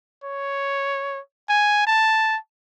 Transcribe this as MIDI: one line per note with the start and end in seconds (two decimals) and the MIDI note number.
0.24 1.20 73
1.49 1.83 80
1.87 2.37 81